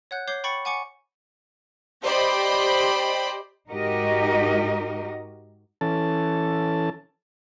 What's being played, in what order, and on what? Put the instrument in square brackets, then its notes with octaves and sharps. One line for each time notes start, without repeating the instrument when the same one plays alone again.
[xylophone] C#5 F#5 F#6 G6
C#5 D6 G6 C7 G7
G5 B5 C#6 A6 C#7 F#7
F#5 G#5 C#6 D6 C#7
[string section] G4 C5 D5 D#5 G5 B5
[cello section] G#2 D#4 F#4 G4 A#4 D#5
[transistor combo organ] E3 C#4 A4 A5